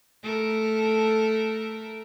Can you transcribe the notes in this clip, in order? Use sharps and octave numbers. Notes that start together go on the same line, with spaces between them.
A3 A4 A#4